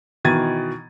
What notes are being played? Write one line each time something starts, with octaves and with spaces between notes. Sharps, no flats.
B2 D#3 E3 G#6 A6 D#7